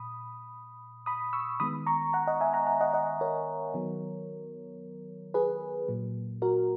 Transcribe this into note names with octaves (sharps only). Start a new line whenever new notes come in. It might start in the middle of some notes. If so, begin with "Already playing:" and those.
Already playing: A#2 B5 D#6
B5 D#6
C#6 E6
D#3 G#3 B3 B5 D#6
A#5 C#6
F#5 A#5
D#5 F#5
E5 G#5
F#5 A#5
F#5 A#5
D#5 F#5
D#5 F#5
A#4 C#5
D#3 F#3 B3
G#4 B4
A#2 F#3 A#3
F#4 A#4